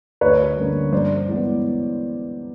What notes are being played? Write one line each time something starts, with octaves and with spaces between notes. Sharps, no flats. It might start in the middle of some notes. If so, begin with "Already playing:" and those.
D2 B4 C#5
D3 G3 A#3 C#4
G2 C5 D5
E3 G#3 B3